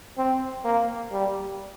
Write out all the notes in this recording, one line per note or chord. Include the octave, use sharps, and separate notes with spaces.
C4
A#3
G3